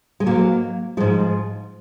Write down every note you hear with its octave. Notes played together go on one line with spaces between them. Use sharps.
G#3
G#2 F#3 A#3
G#2 F3 G#3